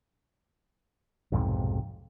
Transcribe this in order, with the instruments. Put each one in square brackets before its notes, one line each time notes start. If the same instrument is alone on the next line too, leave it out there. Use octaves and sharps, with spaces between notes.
[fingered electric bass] B1 F2 G#2 C3